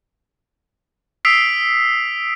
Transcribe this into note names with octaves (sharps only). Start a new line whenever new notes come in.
D#6 E6 B6 C7 D7 F7